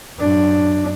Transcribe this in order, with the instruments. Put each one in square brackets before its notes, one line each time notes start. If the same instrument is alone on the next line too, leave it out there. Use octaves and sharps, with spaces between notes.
[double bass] F#2 D4